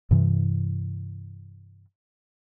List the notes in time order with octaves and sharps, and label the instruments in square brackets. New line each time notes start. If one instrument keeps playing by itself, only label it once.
[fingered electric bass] G2 C3 E3